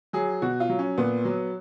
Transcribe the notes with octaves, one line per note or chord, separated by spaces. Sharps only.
F#3 G#4
B2 F#4
F4
F#3
C#4
A#2 B3
F#3